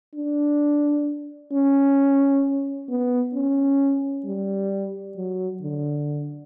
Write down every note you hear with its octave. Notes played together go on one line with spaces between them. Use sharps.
D4
C#4
B3
C#4
G3
F#3
D3